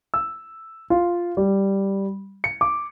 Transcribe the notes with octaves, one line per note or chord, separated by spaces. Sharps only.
E6
F4
G3
C#7
D6